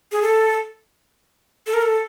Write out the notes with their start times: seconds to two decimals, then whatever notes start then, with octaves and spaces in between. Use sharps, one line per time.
0.12 G#4
0.22 A4
1.67 A4
1.74 A#4
1.82 A4